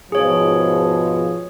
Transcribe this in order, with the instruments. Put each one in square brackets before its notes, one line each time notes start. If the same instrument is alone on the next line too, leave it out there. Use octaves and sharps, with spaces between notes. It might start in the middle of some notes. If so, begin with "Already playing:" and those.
[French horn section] G#2 B2 F3 [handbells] G#4 C#5